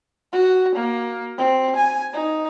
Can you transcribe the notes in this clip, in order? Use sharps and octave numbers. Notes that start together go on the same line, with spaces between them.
F#4
A#3
C4
G#5
D#4